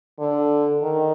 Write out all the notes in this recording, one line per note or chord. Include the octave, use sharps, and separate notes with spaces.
D3
D#3